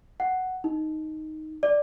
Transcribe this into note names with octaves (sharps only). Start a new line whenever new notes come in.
F#5
D#4
D5